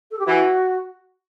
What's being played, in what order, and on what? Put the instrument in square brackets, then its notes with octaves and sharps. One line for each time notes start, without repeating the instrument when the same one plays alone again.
[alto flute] A4
G4
[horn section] E3 [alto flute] F#4